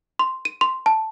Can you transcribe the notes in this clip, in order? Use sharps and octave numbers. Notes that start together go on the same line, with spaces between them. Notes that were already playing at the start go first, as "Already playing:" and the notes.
C6
D#7
C6
A5